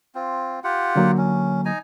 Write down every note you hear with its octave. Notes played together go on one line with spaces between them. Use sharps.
C4 F4
F4 G4 F#5
D3 F#3 A#3
C#4
D#4 G#5 A#5